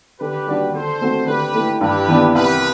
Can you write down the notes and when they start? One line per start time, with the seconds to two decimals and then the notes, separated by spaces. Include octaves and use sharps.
0.20 D3 G4 B4
0.47 G3 D4 F#4
0.73 D3 A4 C5
1.01 A3 C4 F#4
1.27 D3 G4 B4
1.54 A3 E4
1.81 G2 G4 B4
2.08 E3 B3 D4
2.35 C2 G4 B4